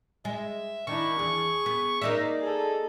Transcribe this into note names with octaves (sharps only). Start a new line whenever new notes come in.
G#3 E5
D#3 D4 E4 C#6
E2 G#4
B3
A#3 D#4 D5 E5
G#4 A4